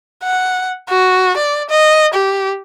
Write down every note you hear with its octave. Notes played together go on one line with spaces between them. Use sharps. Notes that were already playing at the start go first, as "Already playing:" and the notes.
F#5
F#4
D5
D#5
G4